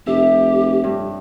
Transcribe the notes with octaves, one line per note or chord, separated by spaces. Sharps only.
F1 G4 E5
G2